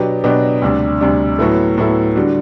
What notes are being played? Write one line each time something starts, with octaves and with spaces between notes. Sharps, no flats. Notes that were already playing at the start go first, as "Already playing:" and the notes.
Already playing: B2 F#3 B3 D4 G4
B2 F#3 B3 D4 G4
D2 C3 G3 D4
D2 C3 G3 D4
A2 F#3 B3 E4 A4
A2 F#3 B3 E4 A4
D3 G3 D4 F#4